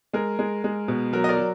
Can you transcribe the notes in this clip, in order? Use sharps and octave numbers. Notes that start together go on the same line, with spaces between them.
G#3 A#4
G#3
G#3
B2
F#3 A#4
D#5
A#4 D5
F#3